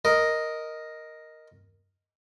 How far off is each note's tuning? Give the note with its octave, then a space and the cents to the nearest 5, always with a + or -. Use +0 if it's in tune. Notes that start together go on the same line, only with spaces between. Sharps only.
A#4 +0 D#5 +0